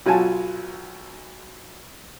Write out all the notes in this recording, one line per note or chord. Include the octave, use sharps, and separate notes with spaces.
B1 F#3 F4 G#5 A5